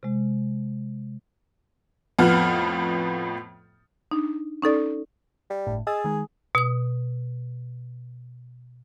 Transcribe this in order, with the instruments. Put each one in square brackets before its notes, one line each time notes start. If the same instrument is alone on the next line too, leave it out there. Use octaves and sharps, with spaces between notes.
[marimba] C3 G#3
[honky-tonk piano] F2 A2 F3 B3 F#5 F6
[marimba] D4 D#4
C#4 D#4 A4 D5
[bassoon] G3
[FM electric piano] G1 A2
[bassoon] G#4 [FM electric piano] D#5 E6 A6
[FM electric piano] D#3 G#3
[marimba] B2 D#6